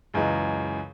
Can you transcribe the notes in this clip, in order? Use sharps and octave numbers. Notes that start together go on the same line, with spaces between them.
C#2 F#2 E3 G#3